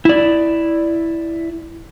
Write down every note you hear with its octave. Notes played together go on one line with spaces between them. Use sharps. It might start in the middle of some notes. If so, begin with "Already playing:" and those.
E4 D5